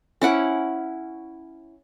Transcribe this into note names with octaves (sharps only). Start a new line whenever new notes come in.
C#4 E4 F#5 D6